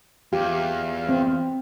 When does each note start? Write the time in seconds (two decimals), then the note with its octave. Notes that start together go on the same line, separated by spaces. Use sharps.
0.33 E2 F4 G4 F5
1.09 C4